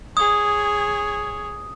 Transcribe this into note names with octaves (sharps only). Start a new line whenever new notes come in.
G#4 C#5 D#6